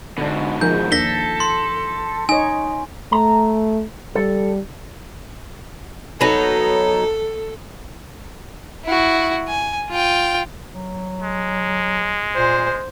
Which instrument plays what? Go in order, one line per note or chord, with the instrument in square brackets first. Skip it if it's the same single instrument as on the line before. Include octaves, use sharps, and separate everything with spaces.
[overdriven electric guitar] G#2 B2 [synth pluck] D3 D4
[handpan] F3 D#4 [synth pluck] G#4 A#4 [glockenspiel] G6
[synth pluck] D#2 A#3 D4 [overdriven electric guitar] A4 [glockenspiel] A#6 B6 G7
[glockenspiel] C6
[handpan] D#4 C#5 [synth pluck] D#5 D#6 [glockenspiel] G#5
[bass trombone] A3 [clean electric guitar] A#5
[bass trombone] G3 [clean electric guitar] A4
[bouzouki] F#3 B3 D#4 [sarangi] A4
[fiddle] E4 F#4
G#5
F4 G5
[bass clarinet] F#3
[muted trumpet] G#3
[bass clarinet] A#2 [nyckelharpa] C5